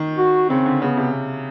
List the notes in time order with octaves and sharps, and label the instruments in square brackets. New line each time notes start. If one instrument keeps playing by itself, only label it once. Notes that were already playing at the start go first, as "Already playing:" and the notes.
Already playing: [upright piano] D#3
[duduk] F#4
[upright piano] C#3 [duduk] C4
[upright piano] D3
[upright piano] C#3 [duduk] B3
[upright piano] C3